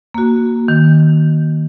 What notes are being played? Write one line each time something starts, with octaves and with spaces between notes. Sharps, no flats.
A#3 F#4
D#3